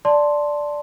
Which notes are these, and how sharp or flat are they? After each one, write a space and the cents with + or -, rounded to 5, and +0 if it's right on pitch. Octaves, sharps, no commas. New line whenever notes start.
D5 +0 A5 +0 C6 +0